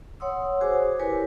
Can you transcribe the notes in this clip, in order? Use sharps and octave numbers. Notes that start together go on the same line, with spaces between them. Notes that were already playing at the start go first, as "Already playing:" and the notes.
C#5 F#5 C6 D#6 E6
F#4 G#4 C5 G#5 D6
E4 G4 A#4 B4 C#5 G#5